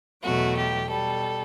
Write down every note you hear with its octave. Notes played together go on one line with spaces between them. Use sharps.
E2 B2 F#3 A3 F#4
G4
B2 G3 A4